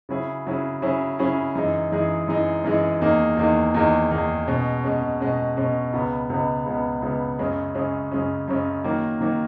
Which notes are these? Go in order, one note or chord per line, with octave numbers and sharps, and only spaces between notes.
C#3 F#3 C#4 E4 G#4
C#3 F#3 C#4 E4 G#4
C#3 F#3 C#4 E4 G#4
C#3 F#3 C#4 E4 G#4
F#2 E3 G#3 D#4 G#4
F#2 E3 G#3 D#4 G#4
F#2 E3 G#3 D#4 G#4
F#2 E3 G#3 D#4 G#4
E2 D#3 A#3 D#4 G#4
E2 D#3 A#3 D#4 G#4
E2 D#3 A#3 D#4 G#4
E2 D#3 A#3 D#4 G#4
B2 G#3 C#4
B2 G#3 C#4
B2 G#3 C#4
B2 G#3 C#4
C#2 C#3 G#3 B3
C#2 C#3 G#3 B3
C#2 C#3 G#3 B3
C#2 C#3 G#3 B3
F#2 C#3 G#3 C#4
F#2 C#3 G#3 C#4
F#2 C#3 G#3 C#4
F#2 C#3 G#3 C#4
D#3 F#3 A#3
D#3 F#3 A#3